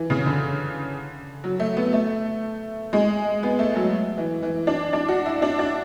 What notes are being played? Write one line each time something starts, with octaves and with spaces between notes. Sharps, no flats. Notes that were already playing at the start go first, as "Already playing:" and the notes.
Already playing: E3
C#3
D3
F#3
A3
B3
A3
G#3
B3
A3
F#3
E3
E3
D4
D4
F#4
E4
D4
D4